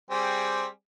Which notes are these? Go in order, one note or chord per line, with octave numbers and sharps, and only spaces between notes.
G3 C4 G#4